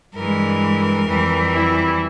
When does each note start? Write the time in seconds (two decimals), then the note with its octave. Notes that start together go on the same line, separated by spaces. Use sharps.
0.16 G2 E3 G#3 A#4
1.07 F2 E3 G3
1.52 E4